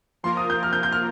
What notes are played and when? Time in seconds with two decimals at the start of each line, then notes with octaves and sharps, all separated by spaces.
0.23 F3 A#3 F4 A#4 C6
0.37 D#6
0.50 G6
0.63 F6
0.73 G6
0.83 G6
0.92 F6